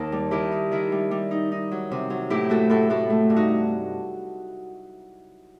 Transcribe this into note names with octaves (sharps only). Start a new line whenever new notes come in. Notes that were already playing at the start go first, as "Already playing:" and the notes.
Already playing: D#2 D#3 A5
G3
D#3 E4 G4
D#4
D#3 E4
G3
G3
D#4
D#4
F#3
C3
F#3
A2 E4 G4
A3 F#4 A4
A2 F#4 A4
A2 F#4 A4
A3
G2
D#4 F#4